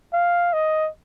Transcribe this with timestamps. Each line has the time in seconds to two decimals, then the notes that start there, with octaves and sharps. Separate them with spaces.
0.13 F5
0.53 D#5